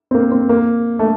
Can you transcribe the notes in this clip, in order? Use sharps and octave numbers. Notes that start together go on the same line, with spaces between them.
C4
A#3
C4
A#3
A3